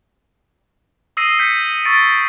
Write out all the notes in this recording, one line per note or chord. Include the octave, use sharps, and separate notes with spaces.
D#6 E6 A#6 C7 D#7
G6 B6 C#7
C#6 E6 A6 D7